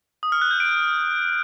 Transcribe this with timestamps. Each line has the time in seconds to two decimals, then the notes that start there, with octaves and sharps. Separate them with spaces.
0.23 D#6
0.32 F6
0.42 F#6
0.51 G6
0.60 D7